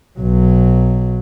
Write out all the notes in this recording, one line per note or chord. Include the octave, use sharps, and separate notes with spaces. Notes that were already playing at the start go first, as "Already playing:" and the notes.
B1 F#3